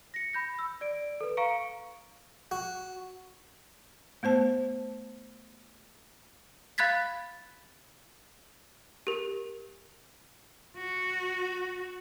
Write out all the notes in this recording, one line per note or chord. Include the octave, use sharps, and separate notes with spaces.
A#6 C#7
B5 G6 A#6
E6
D5 D7
A4 B4
F5 A#5 C#6 C#7 D7
F#4
A3 B3 C5 A5
F5 B5 F#6 G#6 A6 B6
G4 A#4
F#4